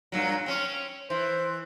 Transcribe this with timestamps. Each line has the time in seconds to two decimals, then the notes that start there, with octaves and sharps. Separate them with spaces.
0.12 G2 A#2 F#3
0.46 C4 C#4
1.10 E3 C5